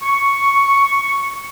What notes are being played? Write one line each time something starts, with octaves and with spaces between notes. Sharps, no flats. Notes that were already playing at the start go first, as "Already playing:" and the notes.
C#6